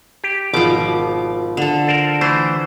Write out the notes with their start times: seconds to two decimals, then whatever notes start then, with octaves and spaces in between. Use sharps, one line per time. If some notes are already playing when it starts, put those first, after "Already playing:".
0.24 G4
0.54 G#1 B2 F3 D6
1.57 D3 A4
1.87 A#4 C5 D5
2.21 E3 A3 C5